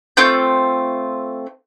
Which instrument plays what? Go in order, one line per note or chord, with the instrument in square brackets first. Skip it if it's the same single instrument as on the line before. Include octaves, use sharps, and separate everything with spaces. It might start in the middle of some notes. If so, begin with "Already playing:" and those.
[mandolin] A3 C4 F4 G6